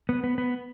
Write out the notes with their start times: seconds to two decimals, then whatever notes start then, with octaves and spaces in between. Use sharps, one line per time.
0.09 B3
0.24 B3
0.38 B3